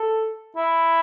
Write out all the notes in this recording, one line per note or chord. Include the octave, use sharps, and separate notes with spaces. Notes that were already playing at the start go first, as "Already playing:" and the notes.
Already playing: A4
E4